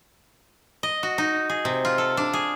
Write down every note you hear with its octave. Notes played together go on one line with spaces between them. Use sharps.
D#5
F#4
D#4
G#4
C3
F4
A4
D4
G#4